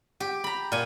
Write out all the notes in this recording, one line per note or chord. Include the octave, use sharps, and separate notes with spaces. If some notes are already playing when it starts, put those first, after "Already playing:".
G4
A#5 B5
A#2 G#5